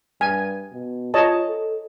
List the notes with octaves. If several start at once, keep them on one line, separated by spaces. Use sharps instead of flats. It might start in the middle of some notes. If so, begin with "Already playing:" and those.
G2 G#5
B2
F4 C#5 D#5 A5
A4